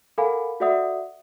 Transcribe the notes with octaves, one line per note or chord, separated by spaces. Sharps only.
A4 A#4 F5 F#5 G#5 B5
F#4 A4 D5 E5 F#5 D#6